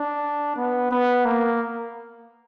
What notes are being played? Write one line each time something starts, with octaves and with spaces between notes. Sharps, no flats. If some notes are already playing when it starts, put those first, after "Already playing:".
Already playing: D4
B3
B3
A#3